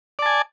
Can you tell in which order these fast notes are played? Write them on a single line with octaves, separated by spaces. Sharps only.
D5 A5 G#5